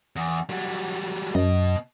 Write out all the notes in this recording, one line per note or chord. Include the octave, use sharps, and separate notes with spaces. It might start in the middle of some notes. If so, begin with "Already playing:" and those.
E2
F#3 G3
F#2 B2 D#5